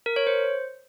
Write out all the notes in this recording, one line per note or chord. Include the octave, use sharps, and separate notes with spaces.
A#4
C#5
C5